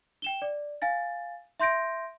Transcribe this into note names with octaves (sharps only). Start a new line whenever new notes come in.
G5 E7 G7
D5
F5 G#5 A6
E5 C6 G6 A#6 D7